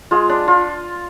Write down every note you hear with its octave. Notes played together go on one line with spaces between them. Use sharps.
G#3 F4
D4
F4